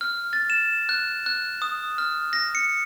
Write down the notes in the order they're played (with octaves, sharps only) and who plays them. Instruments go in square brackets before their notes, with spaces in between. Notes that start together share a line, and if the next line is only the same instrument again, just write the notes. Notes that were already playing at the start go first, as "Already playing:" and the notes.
[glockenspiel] F6
A6
E7
F#6
F#6
D#6
F6
A#6
C#7